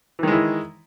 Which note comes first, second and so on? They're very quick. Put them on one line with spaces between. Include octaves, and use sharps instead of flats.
E3 D#3 G#3 E4